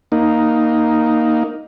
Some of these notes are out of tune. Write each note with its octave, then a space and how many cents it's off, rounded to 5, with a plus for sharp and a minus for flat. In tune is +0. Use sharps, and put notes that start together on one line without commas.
A#3 +0 D#4 +0